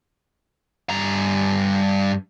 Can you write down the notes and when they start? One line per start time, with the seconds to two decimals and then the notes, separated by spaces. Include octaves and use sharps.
0.90 G2 A#5